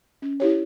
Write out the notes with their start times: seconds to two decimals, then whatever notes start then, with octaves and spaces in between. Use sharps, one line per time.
0.22 C#4
0.40 E4 G4 C#5